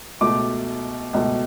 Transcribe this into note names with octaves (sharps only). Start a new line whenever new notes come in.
C#2 B2 A3 D6
C#2 B2 A3